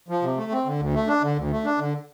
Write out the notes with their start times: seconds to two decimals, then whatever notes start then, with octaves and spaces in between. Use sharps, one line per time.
0.09 F3
0.22 C3
0.37 A3
0.51 C4
0.66 D3
0.80 D2
0.94 A3
1.07 D4
1.22 D3
1.36 D2
1.51 A3
1.65 D4
1.79 D3